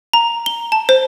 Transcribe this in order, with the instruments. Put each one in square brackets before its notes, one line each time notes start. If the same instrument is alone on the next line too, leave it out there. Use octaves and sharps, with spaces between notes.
[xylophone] A#5
G7
A5
C5